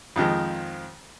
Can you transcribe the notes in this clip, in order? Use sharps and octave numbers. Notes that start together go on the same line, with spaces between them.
F2 D#3 F3 G#3